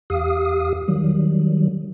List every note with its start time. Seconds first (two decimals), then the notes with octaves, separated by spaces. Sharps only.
0.10 E2 G4 F5 D#6
0.88 D#3 F#3 G3